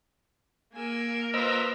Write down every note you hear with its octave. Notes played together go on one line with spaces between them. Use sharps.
A#3 A#4 G#5 E6
F4 B4 C5 D#5 A#5 C6 E6